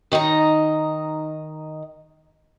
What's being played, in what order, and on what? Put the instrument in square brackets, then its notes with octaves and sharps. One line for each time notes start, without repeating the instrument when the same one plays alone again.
[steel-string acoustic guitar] D#3 D#4 D#5 A#5